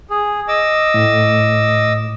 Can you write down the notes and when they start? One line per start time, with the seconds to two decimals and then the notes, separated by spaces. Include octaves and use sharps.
0.10 G#4
0.48 D#5 D6 E6
0.94 A2